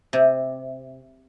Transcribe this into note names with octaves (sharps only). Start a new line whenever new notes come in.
C3